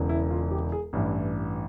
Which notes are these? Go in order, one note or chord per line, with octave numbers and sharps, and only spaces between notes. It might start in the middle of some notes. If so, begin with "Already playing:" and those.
Already playing: E1 E2 C#3 E3
E4
F4
G4
G#4
A1 G2 E3